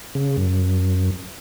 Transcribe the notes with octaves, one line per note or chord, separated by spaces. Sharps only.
C#3
F#2